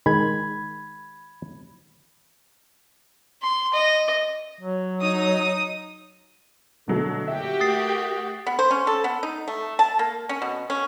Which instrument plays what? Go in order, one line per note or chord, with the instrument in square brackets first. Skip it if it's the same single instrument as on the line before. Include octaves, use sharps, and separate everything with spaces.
[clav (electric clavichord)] D#3 G#3 [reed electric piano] B5 G#6
[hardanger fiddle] C6
D#5
[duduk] F#3
[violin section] D#4 D#6
[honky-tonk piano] B2 F#3 A3 [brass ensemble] D3 A4
[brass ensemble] F#1 A#2 [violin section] F#4 G4 [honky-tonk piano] E5
[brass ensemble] A3 A#4 [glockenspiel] D#6 A6 C7
[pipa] B3
C5
C#4
A4
B3
D#4
A3
A5
A#3
C#4
B2
C#4